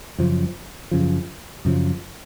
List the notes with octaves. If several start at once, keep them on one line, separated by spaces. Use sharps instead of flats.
F#2 C#3 F3
F#2 C#3 F3
F#2 C#3 F3